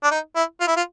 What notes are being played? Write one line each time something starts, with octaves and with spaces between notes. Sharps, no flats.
D4
D#4
E4
F4
E4
F4